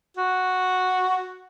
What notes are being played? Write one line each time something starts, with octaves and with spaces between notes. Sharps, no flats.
F#4